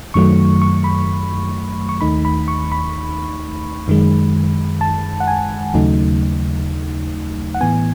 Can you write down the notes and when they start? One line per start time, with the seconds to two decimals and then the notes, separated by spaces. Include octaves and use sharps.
0.14 F#2 D#3 F#3 A3 C#6
0.62 C#6
0.84 B5
1.89 C#6
2.01 D#2 D#3 A3 D#4 B5
2.25 B5
2.48 C#6
2.72 B5
3.88 F#2 D#3 G#3
4.81 A5
5.20 F#5
5.28 G#5
5.74 D#2 C#3 F#3 A3 D#4
7.55 F#5
7.61 A2 E3 B3 G#5